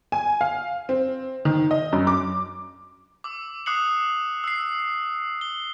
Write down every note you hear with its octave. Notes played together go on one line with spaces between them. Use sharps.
G#5
F5
C4
D#3
D#5
F#2
D6
D6 E6
D6 D#6 F#6 C7 C#7 F#7
E6 C7
G7